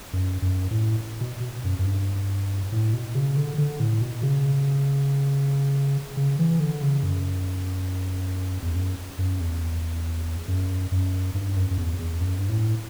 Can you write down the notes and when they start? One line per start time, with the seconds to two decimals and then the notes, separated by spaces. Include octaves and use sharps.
0.13 F#2
0.42 F#2
0.71 A2
1.21 B2
1.64 F#2
1.79 F#2
1.85 G2
2.72 A2
2.94 B2
3.15 C#3
3.37 D3
3.58 D3
3.80 A2
4.02 B2
4.23 C#3
6.17 C#3
6.39 E3
6.60 D3
6.82 C#3
7.03 F#2
8.62 E2
8.75 F#2
9.18 F#2
9.40 E2
10.48 F#2
10.92 F#2
11.34 G2
11.56 F#2
11.71 F#2
11.78 E2
11.99 E2
12.21 F#2
12.39 G2
12.49 A2